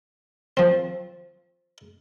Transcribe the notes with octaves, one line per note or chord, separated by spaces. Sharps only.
F3 C4